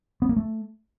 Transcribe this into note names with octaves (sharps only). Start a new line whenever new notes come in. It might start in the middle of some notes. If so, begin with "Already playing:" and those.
B3
A#3
A3